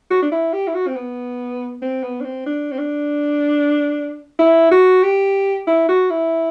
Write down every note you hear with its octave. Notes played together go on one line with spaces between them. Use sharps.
F#4
D4
E4
G4
E4
F#4
C4
B3
C4
B3
D4
C4
D4
C4
D4
E4
F#4
G4
E4
F#4
E4